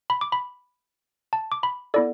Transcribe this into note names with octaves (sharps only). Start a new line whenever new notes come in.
B5
D6
B5
A5
D6
B5
B3 E4 A4 D5